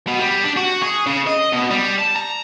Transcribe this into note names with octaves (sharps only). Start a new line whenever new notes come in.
B2
G3
D4
F#4
G#4
C#3
D#5
B2
G3
A5
A#5